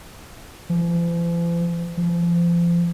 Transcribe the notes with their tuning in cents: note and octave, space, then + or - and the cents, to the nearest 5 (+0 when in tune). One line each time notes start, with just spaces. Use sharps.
F3 -45
F3 -30